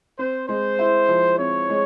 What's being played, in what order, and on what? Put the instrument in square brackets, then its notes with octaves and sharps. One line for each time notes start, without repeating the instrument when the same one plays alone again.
[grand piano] C4 [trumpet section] C5
[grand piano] G#3 [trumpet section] C5
[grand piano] E4
F3
[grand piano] C4 [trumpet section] C#5
[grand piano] G#3